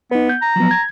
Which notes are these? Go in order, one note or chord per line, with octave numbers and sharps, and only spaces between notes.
B3 D#4 B4
G6
A#5
F3 F#3 B3
G#6